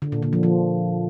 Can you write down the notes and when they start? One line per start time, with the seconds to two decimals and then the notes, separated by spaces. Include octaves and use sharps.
0.02 D3
0.12 A#2
0.22 D3
0.33 F3
0.43 F3